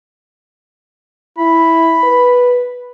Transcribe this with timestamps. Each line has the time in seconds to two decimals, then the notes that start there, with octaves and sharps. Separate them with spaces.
1.38 E4 B5
2.04 B4